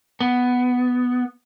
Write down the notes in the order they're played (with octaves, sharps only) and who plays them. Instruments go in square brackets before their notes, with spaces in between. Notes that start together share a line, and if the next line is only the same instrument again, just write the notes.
[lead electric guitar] B3